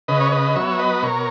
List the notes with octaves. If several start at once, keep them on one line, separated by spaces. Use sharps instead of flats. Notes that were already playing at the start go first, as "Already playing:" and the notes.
C#3 B4 D#5
C#5
B4 D#5
F#3 B3 C#5 E5
B4 D#5
B2 A#4 C#5